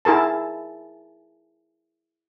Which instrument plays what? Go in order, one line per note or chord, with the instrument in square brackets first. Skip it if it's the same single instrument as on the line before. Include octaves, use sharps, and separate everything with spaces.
[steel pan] E4 G#4 A#4 A5